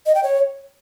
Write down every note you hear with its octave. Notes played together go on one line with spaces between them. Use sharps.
D#5
G5
C#5